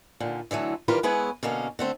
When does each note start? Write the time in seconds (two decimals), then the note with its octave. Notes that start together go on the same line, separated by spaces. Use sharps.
0.20 D#2 A#2 D3
0.51 D3 E3 F#3 A3
0.88 D#3 E3 G3 F4 A#4 B4
1.03 G#3 B3 E4 G#4 B4 C#5
1.43 B2 D3 A#3 C#4
1.79 D3 A3 C4